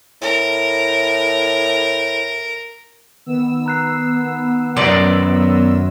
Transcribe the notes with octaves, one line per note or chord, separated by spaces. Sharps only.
A2 A#4
D#3 B3 E6
A#5 F#6 C7
B1 F#2 D5 C6 A#6